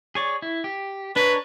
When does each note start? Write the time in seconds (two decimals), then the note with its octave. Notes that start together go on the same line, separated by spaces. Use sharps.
0.15 G#4 C#5 D5
0.42 E4
0.64 G4
1.16 D4 A#4 B4 C#5